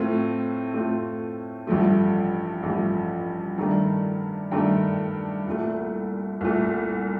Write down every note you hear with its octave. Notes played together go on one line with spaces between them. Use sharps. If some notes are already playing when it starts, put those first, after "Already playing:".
Already playing: A2 A3 C4 F4
A2 A3 C4 F4
A1 G2 F3 A3
A1 G2 F3 A3
G2 D#3 A3 D4
G2 D#3 A3 D4
C2 A#2 A3
C2 A#2 A3